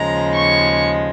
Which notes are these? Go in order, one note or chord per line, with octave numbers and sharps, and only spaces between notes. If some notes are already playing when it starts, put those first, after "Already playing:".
Already playing: D#2 C#3 F3 G#3 A#5
C#6